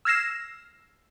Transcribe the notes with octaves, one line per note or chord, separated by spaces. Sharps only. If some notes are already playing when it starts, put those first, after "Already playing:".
E6 F6 G#6 A#6 C7 E7